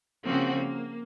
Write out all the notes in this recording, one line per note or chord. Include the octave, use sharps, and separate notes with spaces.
C#3 F3 A#3 C4 F#4
A#3